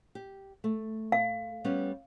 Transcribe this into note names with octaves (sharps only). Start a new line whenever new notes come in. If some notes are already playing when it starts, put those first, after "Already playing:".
G4
A3
F5
G3 B3 C#4